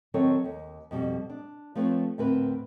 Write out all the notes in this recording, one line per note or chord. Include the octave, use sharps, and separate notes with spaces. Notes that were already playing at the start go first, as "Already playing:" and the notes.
D#3 F#3 C4 A4 C#5
D#2
F2 B2 G3
D4
F3 A3 C4 B4 C#5
D2 A2 C4 A#4 B4